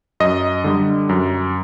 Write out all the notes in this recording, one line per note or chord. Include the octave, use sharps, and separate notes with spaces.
F#2 D#5
D3 G3
F#2